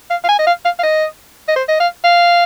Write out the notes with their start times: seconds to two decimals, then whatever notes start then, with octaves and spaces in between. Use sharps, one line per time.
0.10 F5
0.24 F5
0.29 G#5
0.39 D#5
0.47 F5
0.65 F5
0.79 F5
0.83 D#5
1.48 D#5
1.56 C5
1.69 D#5
1.80 F5
2.04 F5